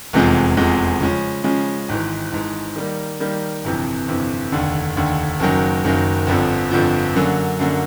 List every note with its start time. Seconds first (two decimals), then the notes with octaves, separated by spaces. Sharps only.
0.13 F1 E2 C3 F3 G#3
0.57 F1 E2 C3 F3 G#3
1.00 C#3 F3 G#3 C#4
1.44 C#3 F3 G#3 C#4
1.89 G#1 G#2 E3
2.32 G#1 G#2 E3
2.76 D#3 G3 A#3
3.20 D#3 G3 A#3
3.64 G1 F2 C3 E3
4.08 G1 F2 C3 E3
4.52 F1 D#2 D3
4.96 F1 D#2 D3
5.40 F#1 F#2 D#3 F#3 A#3
5.84 F#1 F#2 D#3 F#3 A#3
6.27 G1 F2 D3 F3
6.71 G1 F2 D3 F3
7.16 F#2 D3 F#3 A#3
7.59 F#2 D3 F#3 A#3